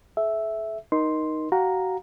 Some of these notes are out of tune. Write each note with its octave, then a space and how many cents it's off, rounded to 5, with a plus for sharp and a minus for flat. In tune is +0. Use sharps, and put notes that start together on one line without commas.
A4 -45 E5 +0
D#4 +0 A#4 +25 C6 +0
F#4 +30 F5 +35 A#5 +0